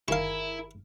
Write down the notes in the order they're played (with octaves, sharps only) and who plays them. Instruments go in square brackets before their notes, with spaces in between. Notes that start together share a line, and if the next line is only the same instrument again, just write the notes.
[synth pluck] G1 D#3 [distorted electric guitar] E4 [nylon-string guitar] G#4 A#4 [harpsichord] F5 C#6